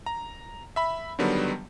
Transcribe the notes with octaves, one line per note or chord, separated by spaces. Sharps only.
A#5
E5 B5
D3 D#3 F#3 G3 B3